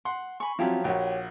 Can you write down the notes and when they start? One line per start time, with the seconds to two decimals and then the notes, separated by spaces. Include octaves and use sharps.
0.05 F#5 C6
0.40 G#5 B5 C#6
0.59 F3 F#3 C4 E4 F4 G4
0.84 A#1 F#4 G4 C#5